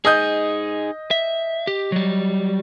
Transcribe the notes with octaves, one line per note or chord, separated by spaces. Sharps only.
D#4 G#4 D#5 D#6 G6
E5
G4
F#3 G3